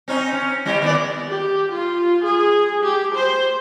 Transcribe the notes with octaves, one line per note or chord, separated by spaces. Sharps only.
C4 C#4 D#4
C#4
G3 E4 G4
D#3 B3 D5
G4
F4
G#4
G4
C5